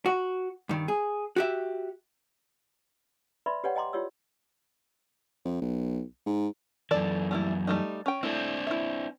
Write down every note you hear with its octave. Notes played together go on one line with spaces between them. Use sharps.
F#4
G2 D#3
G#4
F#4 G4 E5
B4 D5 E5 B5 C6
G4 B4 C#5 D5 F#5 G5
D#5 G5 A#5 C6 D6
E4 F4 G4 C#5 D5 E6
F2
B1
G#2
F#2 E3 A4 D5
G3 A3 E4
G3 A3 D#4
C#4 G5
A3 C4 D4 E4
E4 E5